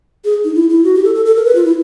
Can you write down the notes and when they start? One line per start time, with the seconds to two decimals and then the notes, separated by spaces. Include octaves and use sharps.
0.25 G#4
0.45 D#4
0.55 E4
0.70 E4
0.84 F#4
0.95 G4
1.05 A4
1.15 A4
1.25 A4
1.36 A#4
1.45 B4
1.55 F4
1.65 E4